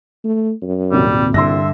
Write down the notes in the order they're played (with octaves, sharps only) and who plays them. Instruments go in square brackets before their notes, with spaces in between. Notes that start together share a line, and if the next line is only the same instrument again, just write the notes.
[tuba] A3
F#2
[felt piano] D#1 G#1 C3 [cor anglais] G3
[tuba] C2 [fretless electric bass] G2 D3 [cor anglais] E5 [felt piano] C6 E6 A#6